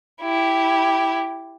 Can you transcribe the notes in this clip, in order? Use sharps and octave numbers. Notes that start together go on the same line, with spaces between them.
E4 G4